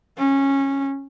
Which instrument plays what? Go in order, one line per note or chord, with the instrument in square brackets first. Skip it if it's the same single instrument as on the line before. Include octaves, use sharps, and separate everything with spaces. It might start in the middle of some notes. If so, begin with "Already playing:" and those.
[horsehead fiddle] C#4